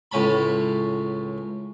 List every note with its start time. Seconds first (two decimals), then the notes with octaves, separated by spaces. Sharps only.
0.12 C#2 A2 C#4 A5 B5